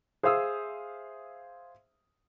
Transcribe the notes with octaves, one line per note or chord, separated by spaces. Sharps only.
G#4 C5 E5 F5 D#6 E6